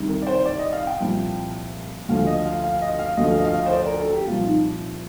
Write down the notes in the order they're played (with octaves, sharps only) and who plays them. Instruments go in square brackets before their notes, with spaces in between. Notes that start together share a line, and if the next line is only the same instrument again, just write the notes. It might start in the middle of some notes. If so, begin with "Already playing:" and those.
Already playing: [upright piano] C2 C3 D#3
A#4
D5
C5
D5
D#5
F5
G5
C2 A#2 F3
D2 D3 F3 F5
D#5
F5
F5
D#5
F5
D2 D3 F3 D#5
F5
D#5
F5
D#5
C5
D5
A#4
A4
G4
C2 A#2 F3 F4
D#4